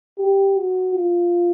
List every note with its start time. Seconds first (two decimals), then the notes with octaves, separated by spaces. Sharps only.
0.19 G4
0.56 F#4
0.95 F4